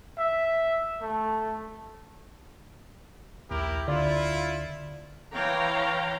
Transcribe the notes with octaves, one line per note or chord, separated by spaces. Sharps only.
E5
A3
A#1 D#2 E4 G4 A#4
D2 D3 E4 F4 D5
E3 C#5 F5 G5 A#5